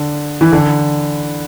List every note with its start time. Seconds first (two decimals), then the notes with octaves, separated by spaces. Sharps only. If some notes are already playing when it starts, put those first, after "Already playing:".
Already playing: D3
0.41 E3
0.52 D3